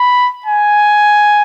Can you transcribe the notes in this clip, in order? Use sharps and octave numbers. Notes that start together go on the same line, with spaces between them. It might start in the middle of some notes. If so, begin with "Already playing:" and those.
Already playing: B5
G#5